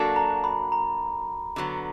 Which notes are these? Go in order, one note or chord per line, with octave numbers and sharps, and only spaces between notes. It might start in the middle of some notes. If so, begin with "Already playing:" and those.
Already playing: F#3 A#3 D4 F#4 A4
A#5
B5
A#5
D3 F#3 B3